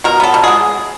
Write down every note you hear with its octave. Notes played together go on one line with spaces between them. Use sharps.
B2 A#4
B3 A4
B2
G#3 G#4